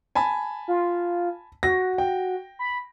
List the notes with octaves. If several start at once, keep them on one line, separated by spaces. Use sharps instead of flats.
G#5 A5 B5
F4
F#4 A#6
G5
B5